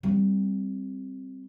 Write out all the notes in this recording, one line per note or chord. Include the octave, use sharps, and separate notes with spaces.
G3 C4